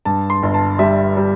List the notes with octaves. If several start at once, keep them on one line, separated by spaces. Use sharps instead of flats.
G2 A5
C6
G1
A5
G3 E5
G3